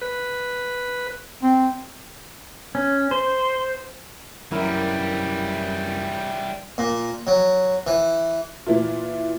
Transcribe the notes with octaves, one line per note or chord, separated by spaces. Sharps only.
B4
C4
C#4
C5
F#2 E3 G3 E4 A#4
A#2
F#3
E3
A#2 E3 E4 F4